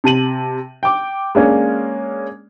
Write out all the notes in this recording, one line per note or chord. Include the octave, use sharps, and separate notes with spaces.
C3 A5 D#7 F#7
G5 D6
G#3 A#3 C#4 D4